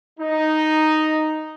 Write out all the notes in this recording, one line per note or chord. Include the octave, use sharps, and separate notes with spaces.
D#4